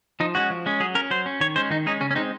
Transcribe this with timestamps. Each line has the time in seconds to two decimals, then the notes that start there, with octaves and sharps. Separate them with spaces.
0.20 F3 D#4
0.35 G#3 C#4 F#4
0.50 F3
0.66 G#3 C#4
0.80 F#3 G#4
0.95 C#4 A#4
1.11 F#3 C5
1.26 C#4
1.40 D#3 C#5
1.56 G#3 C#4 C5
1.70 D#3 D#4
1.86 G#3 C#4 D#4
2.00 C#3 C#4
2.11 C#4
2.15 G#3 C4 D#4